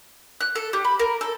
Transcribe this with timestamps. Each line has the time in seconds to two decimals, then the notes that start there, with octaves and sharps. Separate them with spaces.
0.41 F#6
0.55 A4
0.73 G4
0.85 B5
0.99 A#4
1.21 A4